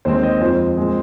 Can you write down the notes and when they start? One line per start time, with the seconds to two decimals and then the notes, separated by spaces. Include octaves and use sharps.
0.05 D#2 D#3 G#3 C4 C5
0.23 D#5
0.41 F2 F3 G#3 C5
0.77 A#2 F3 G#3 C4